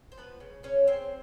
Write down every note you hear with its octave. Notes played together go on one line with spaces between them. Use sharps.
C5
F3 B3 B4
C#3
C#3 C#4 C#5
G#3 C4 C5